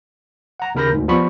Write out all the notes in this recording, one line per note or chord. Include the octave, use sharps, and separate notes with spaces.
F#5 A#5
D#2 C#3 A#4 B5 G6 A#6
D2 G#2
F3 G3 B3 B5 C#6